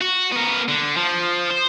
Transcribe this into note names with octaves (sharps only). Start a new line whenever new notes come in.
F#4
B3 A#4
D3
F3
C5